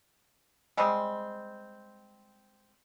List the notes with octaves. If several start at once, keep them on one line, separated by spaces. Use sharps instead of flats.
G3 G#3 C4